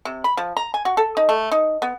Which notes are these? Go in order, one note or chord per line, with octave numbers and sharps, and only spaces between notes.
C3
B5
F3
A#5
G#5
F#4
A4
D#4
A3
D#4
B3